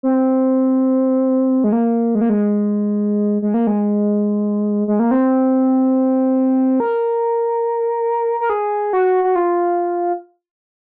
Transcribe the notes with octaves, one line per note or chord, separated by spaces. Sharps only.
C4
G#3
A#3
G#3
A#3
G#3
G#3
A#3
G#3
G#3
A#3
C4
A#4
A#4
G#4
F#4
F#4
F4